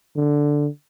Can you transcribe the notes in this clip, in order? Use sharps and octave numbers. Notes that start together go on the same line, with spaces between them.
D3